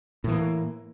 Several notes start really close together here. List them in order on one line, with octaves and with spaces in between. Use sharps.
A2 E3 A#3